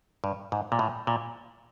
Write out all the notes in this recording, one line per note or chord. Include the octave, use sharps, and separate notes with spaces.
G2
G#2
A#2
A2
A#2